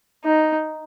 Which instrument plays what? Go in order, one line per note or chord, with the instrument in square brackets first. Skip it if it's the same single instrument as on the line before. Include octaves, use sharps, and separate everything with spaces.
[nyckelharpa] D#4